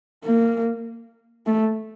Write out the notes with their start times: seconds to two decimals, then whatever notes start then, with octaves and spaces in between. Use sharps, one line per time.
0.24 A#3
1.47 A3